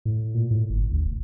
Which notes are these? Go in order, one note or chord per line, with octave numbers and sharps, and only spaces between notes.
A2
A#2
A2
G1
D2
E1